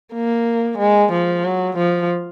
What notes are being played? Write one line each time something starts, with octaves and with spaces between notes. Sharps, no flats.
A#3
G#3
F3
F#3
F3